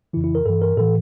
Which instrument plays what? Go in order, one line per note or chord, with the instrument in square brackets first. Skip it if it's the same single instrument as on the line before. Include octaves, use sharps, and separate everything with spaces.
[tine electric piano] F2 C#3 E3 E4
E4
A#4
G2 E3 A4
A#4
A2 E3 A4